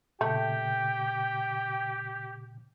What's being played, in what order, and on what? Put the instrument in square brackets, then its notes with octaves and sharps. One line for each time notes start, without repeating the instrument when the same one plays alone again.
[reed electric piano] A#2 C#3 [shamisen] A3 [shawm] G4 [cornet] G5